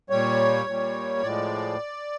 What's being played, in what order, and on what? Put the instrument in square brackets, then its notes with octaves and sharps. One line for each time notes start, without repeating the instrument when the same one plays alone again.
[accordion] A#2 G3 C#5
A#2 G3
A2 F3 G#3 D5